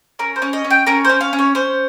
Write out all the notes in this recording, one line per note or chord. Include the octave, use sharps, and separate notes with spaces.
C#4 A#4
C5
C#4
D#5
C#4
G5
C#4 A#4
C#4 C5
F5
C#4
C#5
C#4 C5